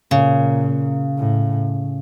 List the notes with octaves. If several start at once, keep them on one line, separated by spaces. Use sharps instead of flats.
A#2 C#3
A2